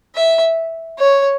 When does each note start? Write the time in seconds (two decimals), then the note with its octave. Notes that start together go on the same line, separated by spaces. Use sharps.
0.15 E5
0.99 C#5